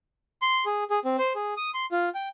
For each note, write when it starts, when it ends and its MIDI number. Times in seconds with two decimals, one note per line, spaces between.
0.42 0.64 84
0.66 0.84 68
0.90 0.99 68
1.05 1.17 60
1.18 1.33 72
1.35 1.54 68
1.57 1.70 87
1.74 1.86 84
1.92 2.09 65
2.15 2.29 79